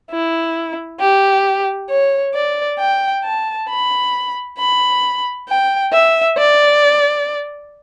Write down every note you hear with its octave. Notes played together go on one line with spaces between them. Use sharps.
E4
G4
C#5
D5
G5
A5
B5
B5
G5
E5
D5